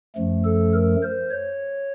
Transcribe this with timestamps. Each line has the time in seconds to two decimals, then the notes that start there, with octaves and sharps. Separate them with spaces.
0.16 F#2 F3 A3
0.45 A4
0.73 A#4
1.03 C5
1.31 C#5